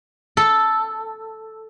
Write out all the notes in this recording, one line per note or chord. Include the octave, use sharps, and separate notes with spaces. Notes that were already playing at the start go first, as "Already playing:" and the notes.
A4